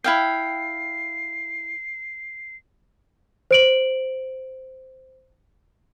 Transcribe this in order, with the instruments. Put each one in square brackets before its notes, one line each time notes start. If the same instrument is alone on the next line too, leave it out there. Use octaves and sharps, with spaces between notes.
[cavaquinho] E4 F5 G5 [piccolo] C7
[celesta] C5 D7 F#7